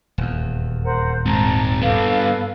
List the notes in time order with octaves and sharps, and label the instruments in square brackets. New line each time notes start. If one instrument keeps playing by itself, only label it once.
[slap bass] D#1 E2
[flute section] A#4 C5 F#5
[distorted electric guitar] G#2 C4 [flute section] A5 A#5
[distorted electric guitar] G2 B3 [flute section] A4 B4 F5